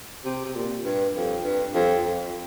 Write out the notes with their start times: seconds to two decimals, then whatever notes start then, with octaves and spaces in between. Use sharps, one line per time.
0.25 C3
0.45 C3
0.55 A#2
0.84 G2
1.15 F2
1.44 G2
1.74 F2
2.04 F2